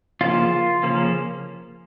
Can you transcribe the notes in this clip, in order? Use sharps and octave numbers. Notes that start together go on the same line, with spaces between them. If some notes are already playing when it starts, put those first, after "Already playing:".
C#3 F3 A#3 C#4 F4
C#3 F3 A#3 C#4